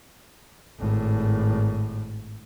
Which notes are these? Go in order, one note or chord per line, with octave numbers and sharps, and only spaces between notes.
G#1 A2